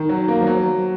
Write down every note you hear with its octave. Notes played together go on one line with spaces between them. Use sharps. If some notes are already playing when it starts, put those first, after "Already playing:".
Already playing: D#3
F#3
A#3
F3
F#3